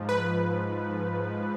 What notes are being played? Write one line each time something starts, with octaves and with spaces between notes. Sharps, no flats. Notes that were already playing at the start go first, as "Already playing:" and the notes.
Already playing: G#2 F3
B4